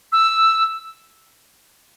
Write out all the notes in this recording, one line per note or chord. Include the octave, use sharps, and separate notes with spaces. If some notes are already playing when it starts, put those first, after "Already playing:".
E6